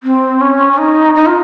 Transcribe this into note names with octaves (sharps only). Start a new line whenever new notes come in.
C4
C#4
C#4
D#4
D#4
F4